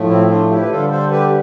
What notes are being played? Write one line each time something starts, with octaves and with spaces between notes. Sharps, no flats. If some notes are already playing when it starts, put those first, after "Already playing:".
Already playing: A2 F3 A3
C4 E4
D4 F4
E4 G4
B4
D3 G3 F4 A4
A4 C5
G4 B4